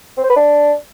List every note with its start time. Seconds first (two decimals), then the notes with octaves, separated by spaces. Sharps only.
0.17 C4
0.24 C5
0.30 B4
0.36 D4